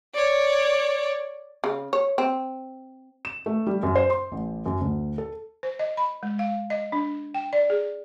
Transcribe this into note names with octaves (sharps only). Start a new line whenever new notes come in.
C#5 D5
C#3
C#5
C4
E7
A3
G3
F#2
C5
C6
A1
F#2
D2
A4
C5
D#5
B5
G#3
F5
D#5
D4
G5
D5
G#4